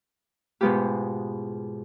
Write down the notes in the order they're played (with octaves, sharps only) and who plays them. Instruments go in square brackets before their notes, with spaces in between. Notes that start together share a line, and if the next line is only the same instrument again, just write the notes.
[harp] G#2 B2 G#3 B3 F4 G4